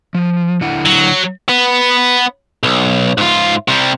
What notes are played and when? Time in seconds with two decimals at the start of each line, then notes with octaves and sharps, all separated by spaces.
0.15 F3
0.61 D3 E4 F#5
0.85 F#3
1.49 B3
2.63 B1
3.18 G#2 F4
3.68 C3 G3